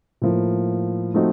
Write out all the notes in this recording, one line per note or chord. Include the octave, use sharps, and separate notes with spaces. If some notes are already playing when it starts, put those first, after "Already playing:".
A2 F3 A#3
F3 A3 C4 D#4 F#4